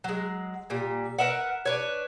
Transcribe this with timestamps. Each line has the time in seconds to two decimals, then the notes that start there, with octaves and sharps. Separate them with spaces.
0.04 F#3 G#3
0.70 A#2 G3
1.19 A#4 B4 E5 F#5
1.65 D4 B4 C#5